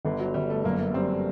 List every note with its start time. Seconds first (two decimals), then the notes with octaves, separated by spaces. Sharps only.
0.05 G1 D3
0.20 F#3
0.34 G1 G3
0.50 A3
0.64 F#2 A#3
0.94 G3 C4